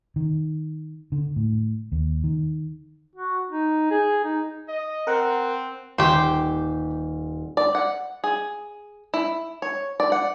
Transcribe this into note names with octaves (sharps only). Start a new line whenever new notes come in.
D#3
D3
A2
D#2
D#3
F#4
D#4
G#4
D#4
D#5
C4 A#4 F#5
D#1 G4 C5
D5
F#5
G#4
E4
C#5
D5
F#5